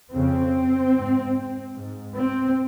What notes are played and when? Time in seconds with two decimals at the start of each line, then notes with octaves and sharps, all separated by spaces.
0.12 F2 C#3 C4
0.94 G#2
1.75 G#2
2.15 C4